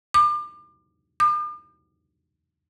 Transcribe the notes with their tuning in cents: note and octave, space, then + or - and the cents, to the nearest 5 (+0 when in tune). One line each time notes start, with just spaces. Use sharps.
D6 +35
D6 +45